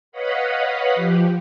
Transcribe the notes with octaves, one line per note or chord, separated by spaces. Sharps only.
B4 C#5 D#5 F5 F#5 B5
F3 G4